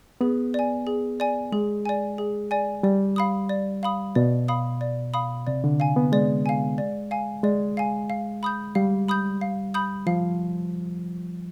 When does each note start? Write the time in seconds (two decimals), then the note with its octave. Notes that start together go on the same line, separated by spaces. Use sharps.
0.21 B3 G#4
0.54 D5 G#5
0.87 G#4
1.20 D5 G#5
1.52 G#3 G#4
1.85 D5 G#5
2.18 G#4
2.51 D5 G#5
2.83 G3 D5
3.16 F5 B5 D#6
3.49 D5
3.83 F5 B5 D#6
4.15 B2 D5
4.48 F5 B5 D#6
4.81 D5
5.14 F5 B5 D#6
5.47 C3 D5
5.64 D3
5.80 F5 G#5
5.96 B3
6.12 G#3 D5
6.46 F5 G#5
6.78 D5
7.11 F5 G#5
7.43 G#3 D5
7.77 F5 G#5
8.10 F5
8.43 B5 D#6 G6
8.75 G3 F5
9.08 B5 D#6 G6
9.41 F5
9.74 B5 D#6 G6
10.07 F3 F5